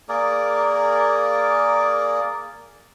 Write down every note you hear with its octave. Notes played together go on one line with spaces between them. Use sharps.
A#3 G#4 A#4 D5